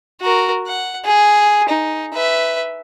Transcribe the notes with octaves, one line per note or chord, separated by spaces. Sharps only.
F#4 A#4
F#5
G#4
D#4
B4 E5